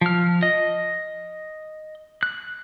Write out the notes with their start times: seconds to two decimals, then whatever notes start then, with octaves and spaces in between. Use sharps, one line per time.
0.01 F3 F6
0.43 D#5
2.23 F#6